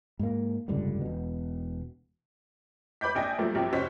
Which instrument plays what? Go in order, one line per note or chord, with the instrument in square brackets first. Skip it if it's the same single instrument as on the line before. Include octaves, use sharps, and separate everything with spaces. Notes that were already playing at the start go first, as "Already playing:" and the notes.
[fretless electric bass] G#2 A#3
F1 C#2 G2 D3
E1 B2
[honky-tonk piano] B4 B5 D6 G6 B6
A#1 D4 G5 G#5 D#6 A#6
F#2 A#2 F3 G3 A3
A#1 F#2 F3 G4
F1 F3 C#4 F#4 C5 B6